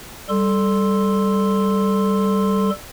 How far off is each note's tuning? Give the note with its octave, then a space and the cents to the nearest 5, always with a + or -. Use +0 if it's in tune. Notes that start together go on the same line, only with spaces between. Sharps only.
G3 +0 A4 +0 C6 +0